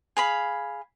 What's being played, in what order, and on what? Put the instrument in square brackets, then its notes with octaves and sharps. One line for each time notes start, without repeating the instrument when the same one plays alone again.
[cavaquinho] G#4 F5 B5